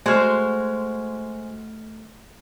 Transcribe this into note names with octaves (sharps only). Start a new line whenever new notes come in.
G#3 A3 F#4 C5 F6